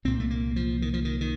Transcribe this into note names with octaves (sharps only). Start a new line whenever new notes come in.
C2 A#2 C4
A3
A#3
F3
D#3
F3
D#3
D#3